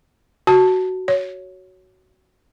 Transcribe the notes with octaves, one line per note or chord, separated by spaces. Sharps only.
F#4 A5
C#5